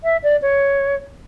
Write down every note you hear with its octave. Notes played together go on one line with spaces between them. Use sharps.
E5
D5
C#5